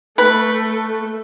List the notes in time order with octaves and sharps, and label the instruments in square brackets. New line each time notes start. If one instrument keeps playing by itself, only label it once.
[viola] A3 [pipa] B4